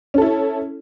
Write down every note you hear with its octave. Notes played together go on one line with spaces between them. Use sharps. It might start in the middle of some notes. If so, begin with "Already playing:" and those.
C#4 E4 A4